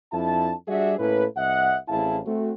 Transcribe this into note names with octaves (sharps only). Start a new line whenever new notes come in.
F2 D4 E4 A5
G3 D4 F#4 G#4 D5 E5
A2 A#3 C#4 E4 A4 B4
C2 D#5 E5 F#5
A1 C4 E4 G#4 F5 A5
A3 C4 F#4